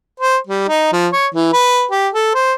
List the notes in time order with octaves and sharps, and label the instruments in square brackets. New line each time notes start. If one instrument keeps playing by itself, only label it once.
[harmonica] C5
G3
D#4
F3
C#5
E3
B4
G4
A4
C5